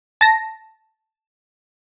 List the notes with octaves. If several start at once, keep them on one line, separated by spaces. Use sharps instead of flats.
A5 A#6